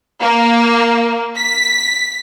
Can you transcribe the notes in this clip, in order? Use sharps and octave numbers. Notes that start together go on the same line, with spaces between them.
A#3
B6